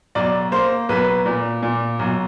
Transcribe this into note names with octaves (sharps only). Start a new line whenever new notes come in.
B1 D5
A#3 C5
B1 B4
A#2
A#2
B1